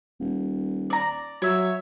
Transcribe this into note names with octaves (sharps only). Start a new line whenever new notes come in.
D#1
D5 A#5
F#3 C#5 E5